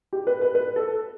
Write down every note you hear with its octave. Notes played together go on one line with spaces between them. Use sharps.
G4
B4
B4
B4
A4